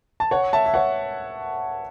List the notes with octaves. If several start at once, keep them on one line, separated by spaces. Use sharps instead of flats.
A5
C#5 F#5
E5 A5
E5
C#5 F#5